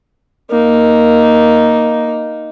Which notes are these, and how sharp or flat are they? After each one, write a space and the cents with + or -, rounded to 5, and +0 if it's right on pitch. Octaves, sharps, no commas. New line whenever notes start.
A#3 +5 D#4 +0